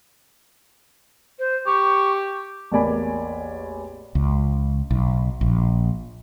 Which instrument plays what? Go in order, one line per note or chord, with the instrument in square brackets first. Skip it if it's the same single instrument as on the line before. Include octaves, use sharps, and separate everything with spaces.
[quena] C5
[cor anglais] G4 [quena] C#6
[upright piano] A1 E2 A#3 D5 G#5 B5
[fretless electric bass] C#2
B1
A#1